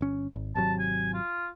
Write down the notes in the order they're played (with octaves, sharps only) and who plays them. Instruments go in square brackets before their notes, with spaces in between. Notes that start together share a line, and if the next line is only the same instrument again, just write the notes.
[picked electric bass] G1 C#4
G#1
[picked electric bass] G#1 C3 F#3 [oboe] A5
[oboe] G#5
F4